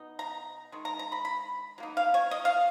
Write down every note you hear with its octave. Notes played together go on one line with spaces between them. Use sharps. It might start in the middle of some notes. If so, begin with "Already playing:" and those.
Already playing: B2 D#4
A#5
D#3 G#3
A#5
A#5
B5
B5
F#3 A#3 D#4
F5
C#5
D#5
F5